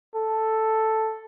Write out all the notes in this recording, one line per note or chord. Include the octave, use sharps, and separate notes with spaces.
A4